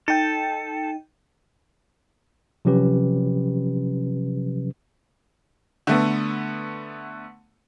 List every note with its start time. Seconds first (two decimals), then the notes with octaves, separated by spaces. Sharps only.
0.08 D#4 A4 G5
2.65 C3 F3 F#3 C#4 G4 B4
5.87 D3 A3 B3